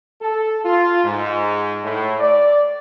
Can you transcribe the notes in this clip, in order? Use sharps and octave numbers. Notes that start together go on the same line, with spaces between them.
A4
F4
G#2
A2
D5